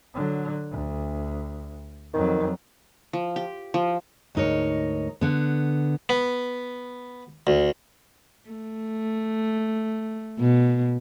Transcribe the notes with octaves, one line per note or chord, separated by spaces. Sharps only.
D3 F#3
D2
F2 D#3 F#3
F3
G4
F3
D2 G#2 D#4 A#4 C#5
D3 B3
B3
D2
A3
B2